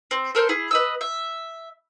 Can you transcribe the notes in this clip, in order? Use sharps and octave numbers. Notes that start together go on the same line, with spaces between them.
C4
A4 A#4 C5
E4 G#4
B4 D#5 E6
E5